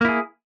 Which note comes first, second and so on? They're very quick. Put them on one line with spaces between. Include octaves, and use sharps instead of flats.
A#3 E4 G#4